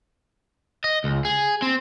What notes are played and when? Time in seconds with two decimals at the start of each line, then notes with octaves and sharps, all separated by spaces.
0.84 D#5
1.04 C#2
1.25 G#4
1.62 C4